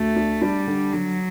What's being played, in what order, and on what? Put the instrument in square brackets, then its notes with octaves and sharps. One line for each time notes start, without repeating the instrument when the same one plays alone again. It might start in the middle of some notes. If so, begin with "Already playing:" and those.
Already playing: [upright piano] D2 [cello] A3
[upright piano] D4
[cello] G3 [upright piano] D4
[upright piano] D3
[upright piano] D3 [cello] F#3